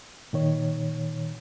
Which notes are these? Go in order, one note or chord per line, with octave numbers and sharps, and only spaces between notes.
A#2 D#3 C#5